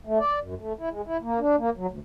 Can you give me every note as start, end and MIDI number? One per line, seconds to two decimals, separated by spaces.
0.07 0.19 57
0.19 0.39 74
0.41 0.54 42
0.59 0.73 57
0.79 0.89 64
0.92 1.01 56
1.06 1.17 64
1.22 1.39 58
1.40 1.56 62
1.59 1.70 58
1.77 1.86 54
1.91 1.99 38